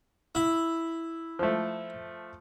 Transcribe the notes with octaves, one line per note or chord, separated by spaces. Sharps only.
E4
F3 A3